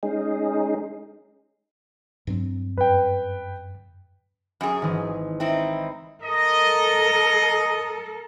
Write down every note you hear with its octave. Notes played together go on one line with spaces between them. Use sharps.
G#3 C#4 D#4 G#4
G2 F#3 C4
F#2 B4 G5
F#2 G#4
G#1 E3
C4 D#4 E4
A4 A#4 D#5